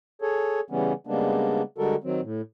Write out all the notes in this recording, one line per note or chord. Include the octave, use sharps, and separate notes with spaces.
G#4 A4 C#5
C#3 E3 G3 B3 C#4
C#3 G3 G#3 A#3 B3 D4
D3 G3 G#3 F#4 A4 A#4
D#3 F#3 C4
A2